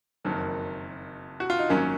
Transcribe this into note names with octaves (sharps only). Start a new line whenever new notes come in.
F#1 F2 D#3 F#3 A#3
F#4
F4
D#4
G#1 F#2 D#3 F#3 A#3 C#4